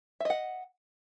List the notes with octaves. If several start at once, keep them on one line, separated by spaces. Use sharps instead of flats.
D#5 E5 F#5